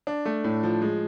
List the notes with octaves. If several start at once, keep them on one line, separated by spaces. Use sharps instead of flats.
D4
A3
A2
F3
G#3